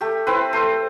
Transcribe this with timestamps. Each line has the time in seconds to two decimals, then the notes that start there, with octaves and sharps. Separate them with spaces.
0.01 A3 G4
0.27 C4 E4 B4
0.53 A3 C5